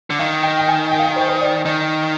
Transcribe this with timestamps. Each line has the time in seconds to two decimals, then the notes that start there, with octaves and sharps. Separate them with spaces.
0.10 D3
0.19 D#3 F5
0.43 G5
0.59 G5
0.68 G#5
0.91 G5
0.99 F5
1.06 G5
1.16 C5
1.29 C5
1.41 D5
1.65 D#3 D#5